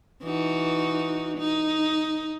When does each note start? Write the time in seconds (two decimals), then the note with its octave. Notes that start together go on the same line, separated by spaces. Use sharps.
0.24 E3 D#4 F#4
1.38 D#4